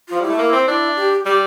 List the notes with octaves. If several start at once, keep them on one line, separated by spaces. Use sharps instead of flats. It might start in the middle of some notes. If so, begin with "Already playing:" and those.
F3 F4
G3 E4
A3
A#3
C4
D4 E4
G4
G3 G4